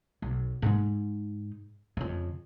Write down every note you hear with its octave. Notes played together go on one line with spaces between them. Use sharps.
B1
G#2 D#4
F2 C#3